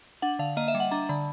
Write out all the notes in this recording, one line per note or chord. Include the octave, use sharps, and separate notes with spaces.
D4 F#5
D3 F5
A#3 D#5
E5
G3
F#5
D4 A#5
D3 B5